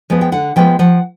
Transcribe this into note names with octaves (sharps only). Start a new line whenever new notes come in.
F3 G#3 B3
G5
D3 F#5
F3 G#3 B3 G5
F3 F#5